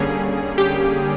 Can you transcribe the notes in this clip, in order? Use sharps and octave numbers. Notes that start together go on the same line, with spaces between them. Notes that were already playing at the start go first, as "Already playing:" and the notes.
Already playing: D3 G3 A#3 C#4 G#4
G4